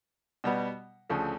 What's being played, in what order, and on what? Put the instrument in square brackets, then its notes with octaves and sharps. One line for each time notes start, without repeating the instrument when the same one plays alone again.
[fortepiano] B2 G3 B3
D2 C#3 F3 A3